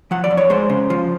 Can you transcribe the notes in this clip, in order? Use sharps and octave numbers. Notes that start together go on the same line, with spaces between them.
F3 F#5
D5
F2
C#5
G#3 C5
C#3
F3